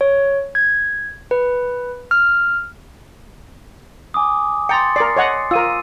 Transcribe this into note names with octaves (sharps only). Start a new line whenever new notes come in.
C#5
G#6
B4
F6
G#5 D6 D#6
G5 A#5 C6 A6 C#7
A#4 D5 C7
C#5 D#5 F#5
F4 A#4 E6 D#7